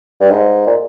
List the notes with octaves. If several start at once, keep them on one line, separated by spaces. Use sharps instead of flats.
G2
G#2
A#2